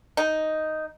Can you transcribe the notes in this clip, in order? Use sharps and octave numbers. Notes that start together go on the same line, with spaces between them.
D#4